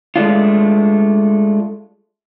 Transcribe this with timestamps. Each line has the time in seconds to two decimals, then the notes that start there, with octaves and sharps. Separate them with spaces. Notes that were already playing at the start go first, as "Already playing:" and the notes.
0.16 G#3 A3 D4 F4